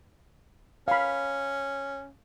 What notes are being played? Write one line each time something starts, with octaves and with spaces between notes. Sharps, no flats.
C#4 F5 B5